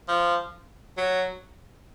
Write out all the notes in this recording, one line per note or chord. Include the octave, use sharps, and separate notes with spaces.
F3
F#3